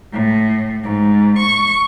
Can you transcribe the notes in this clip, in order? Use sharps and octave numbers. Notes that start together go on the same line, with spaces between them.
A2
G#2
C#6